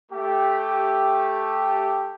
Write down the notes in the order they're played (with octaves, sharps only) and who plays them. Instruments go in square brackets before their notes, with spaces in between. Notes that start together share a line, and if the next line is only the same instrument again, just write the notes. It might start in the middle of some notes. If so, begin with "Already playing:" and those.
[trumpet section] A3 G4